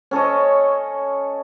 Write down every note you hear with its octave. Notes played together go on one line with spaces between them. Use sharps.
C#4 A4 C#5 D#5